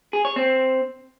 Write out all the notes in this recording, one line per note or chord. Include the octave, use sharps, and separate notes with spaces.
G#4
C#5
C4